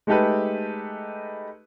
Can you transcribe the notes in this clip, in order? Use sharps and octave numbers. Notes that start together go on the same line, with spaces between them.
G#3 A3 D#4 G4 A4 B4